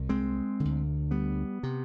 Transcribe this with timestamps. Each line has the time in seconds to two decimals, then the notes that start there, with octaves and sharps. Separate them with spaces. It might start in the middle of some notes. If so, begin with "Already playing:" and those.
Already playing: C2 C3
0.09 G#3 C4
0.60 D3
0.65 D2
1.11 G3 B3
1.63 C3